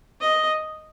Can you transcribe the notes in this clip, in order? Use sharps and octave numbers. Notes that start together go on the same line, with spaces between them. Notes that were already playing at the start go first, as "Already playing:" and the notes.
D#5